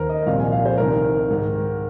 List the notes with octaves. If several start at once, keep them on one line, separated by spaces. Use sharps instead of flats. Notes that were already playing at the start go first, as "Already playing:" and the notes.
Already playing: D#2 D#3 A#4 C5
D#5
D#5
C2 A#2 F3 F5
G#5
F5
C5
C2 C3 D#3 A#4
G#2 D#3